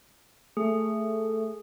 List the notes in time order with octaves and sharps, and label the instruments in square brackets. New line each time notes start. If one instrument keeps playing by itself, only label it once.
[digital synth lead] A3 [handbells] G#4